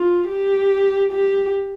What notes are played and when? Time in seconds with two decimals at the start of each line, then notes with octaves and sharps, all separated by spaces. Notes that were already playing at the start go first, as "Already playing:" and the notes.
Already playing: F4
0.28 G4
1.12 G4